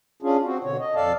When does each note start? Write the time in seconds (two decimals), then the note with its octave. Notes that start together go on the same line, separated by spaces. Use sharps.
0.22 C#4 D4 F4 G#4
0.44 C4 F#4
0.64 B2 D3 C#5
0.79 D#5
0.96 F2 A4 D5 F5 A5